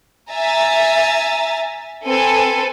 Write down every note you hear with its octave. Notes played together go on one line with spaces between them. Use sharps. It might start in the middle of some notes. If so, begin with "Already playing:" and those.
E5 G#5 A#5 A6
C4 A4 B4 G#5